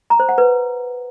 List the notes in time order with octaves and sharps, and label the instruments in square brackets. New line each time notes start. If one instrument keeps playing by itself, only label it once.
[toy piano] A#5
C5
F#5
B4